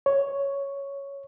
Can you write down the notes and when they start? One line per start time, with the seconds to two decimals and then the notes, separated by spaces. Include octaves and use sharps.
0.06 C#5